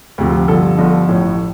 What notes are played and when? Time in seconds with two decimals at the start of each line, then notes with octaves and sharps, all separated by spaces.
0.18 D2 C3 F3
0.48 G1 G2 D3 F3 A4
0.78 G1 G2 D3 F3
1.08 A1 A2 F3